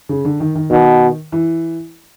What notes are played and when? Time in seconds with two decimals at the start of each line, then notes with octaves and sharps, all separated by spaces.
0.09 C#3
0.25 D3
0.40 D#3
0.55 D#3
0.71 B2 D#3
1.32 E3